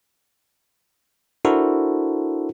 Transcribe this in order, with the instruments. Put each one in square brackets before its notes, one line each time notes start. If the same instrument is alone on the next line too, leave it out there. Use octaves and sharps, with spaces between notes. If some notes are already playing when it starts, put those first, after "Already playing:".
[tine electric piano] D4 E4 F#4 A4 A#4 C5